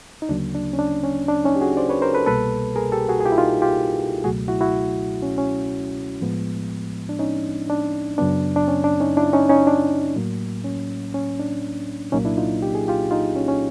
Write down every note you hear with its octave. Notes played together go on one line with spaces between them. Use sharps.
D#4
D2 C#3 F#3 A#3 D4
D4
C#4
D4
C#4
D4
C#4 D#4
G4
F#4 G#4
C5 D5
B4 C#5
A#4 C5
A4 B4
C2 B2 G3 A#3 A4 B4
G#4 A#4
G4 A4
F#4 G#4
G#4
F4 G4
E4
D#4 F4
F4 G4
C#2 B2 F#3 A3 F#4 G#4
E4 F#4
E4 F#4
C#4
C#4
A2 F3 G#3 B3
D4
C#4 D#4
D4
F#2 C#3 F#3 B3 D4
D4
C#4
D4
C#4 D#4
D4 E4
C#4 D#4
C#4 D#4
D4
A2 F#3 A#3
C#4
C#4
D4
C2 A#2 F#3 A#3 C#4 D#4
D4 E4
D#4 F4
G4
G#4
F4 G4
D#4 F4
C#4
C#4